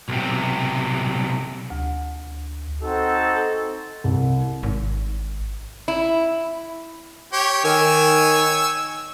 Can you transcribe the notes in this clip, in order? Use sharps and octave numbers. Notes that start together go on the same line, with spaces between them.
B1 C3
D2
C4 D#4 F#4 A4
C2
G#1
E4
G4 C#5
D#3 C#5 G#5 E6